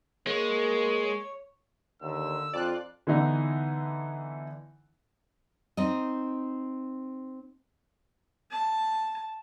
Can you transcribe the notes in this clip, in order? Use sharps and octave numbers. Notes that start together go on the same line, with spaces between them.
G#3 A#3 C#5
D#2 D3 E6
F2 C4 D4 F4 D5 F#6
D3 E3 B3 D#4 E4
C4 D#4 D#5
A5